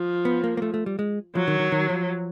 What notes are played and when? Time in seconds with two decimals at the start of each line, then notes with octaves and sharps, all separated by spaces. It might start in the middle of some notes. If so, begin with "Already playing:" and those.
Already playing: F3
0.25 B3
0.44 A#3
0.57 A#3
0.62 A3
0.74 A3
0.86 G3
0.99 G#3
1.35 F3 F#3
1.48 D#3
1.59 D#3
1.72 D#3
1.90 F3